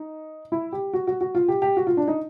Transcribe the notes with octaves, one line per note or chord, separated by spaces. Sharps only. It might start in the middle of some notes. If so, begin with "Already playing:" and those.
Already playing: D#4
E4
G4
F#4
F#4
F#4
F4
G4
G4
F#4
F4
D4
D#4